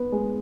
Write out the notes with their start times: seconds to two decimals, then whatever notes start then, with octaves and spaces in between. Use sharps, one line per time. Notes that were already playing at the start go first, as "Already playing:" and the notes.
Already playing: B3
0.12 G#3